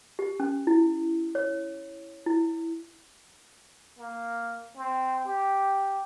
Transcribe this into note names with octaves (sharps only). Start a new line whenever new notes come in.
G4
C#4
E4
C#5
E4
A#3
C4
G4